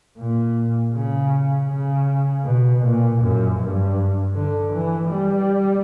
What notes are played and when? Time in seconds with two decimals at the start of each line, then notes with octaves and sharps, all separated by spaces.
0.18 A#2
0.95 C#3
1.69 C#3
2.45 B2
2.83 A#2
3.21 F#2
3.59 G2
4.35 D3
4.73 E3
5.11 G3